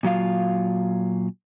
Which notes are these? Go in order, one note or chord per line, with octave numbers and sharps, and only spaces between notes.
A#2 F#3 F4 F5